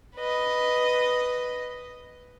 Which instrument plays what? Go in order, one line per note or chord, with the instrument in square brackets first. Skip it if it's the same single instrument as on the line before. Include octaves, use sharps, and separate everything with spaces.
[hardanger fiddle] B4 D#5